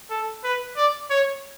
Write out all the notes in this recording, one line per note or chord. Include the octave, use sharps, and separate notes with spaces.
A4
B4
D5
C#5